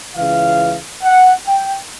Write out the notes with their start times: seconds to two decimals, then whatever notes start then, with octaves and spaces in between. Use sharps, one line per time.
0.16 C#2 C#3 E3 F5
1.03 F#5
1.46 G5